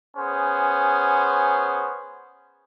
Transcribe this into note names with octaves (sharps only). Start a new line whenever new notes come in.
B3 C#4 G#4 C5